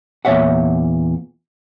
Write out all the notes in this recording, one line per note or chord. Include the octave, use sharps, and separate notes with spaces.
E2 A#2 C#5 E5 F#5